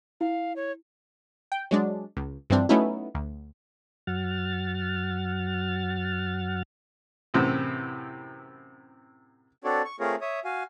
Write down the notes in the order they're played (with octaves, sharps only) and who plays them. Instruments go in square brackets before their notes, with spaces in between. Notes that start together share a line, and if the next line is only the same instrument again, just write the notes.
[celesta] E4 [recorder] F5
[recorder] C#5
[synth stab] G5
F#3 G#3 D4
C#2
G2 E3 F3 C4 D4
F#3 A3 B3 C#4 D#4 E4
D2
[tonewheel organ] F#2 F#3 F#5 F6 A6
[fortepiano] F#2 A2 C3 E3 C4
[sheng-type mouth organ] C4 D4 F#4 A4 C#5 D5
C#6
A3 C4 F4 G#4 A#4 C#5
C#5 E5 D#6
F#4 F5 G#5